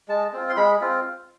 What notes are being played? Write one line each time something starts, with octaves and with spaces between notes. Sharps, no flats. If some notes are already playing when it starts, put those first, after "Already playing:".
G#3 A5
C4 F4
C6
G#3 B5
C4 F4